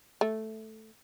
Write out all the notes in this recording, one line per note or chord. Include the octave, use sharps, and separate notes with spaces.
A3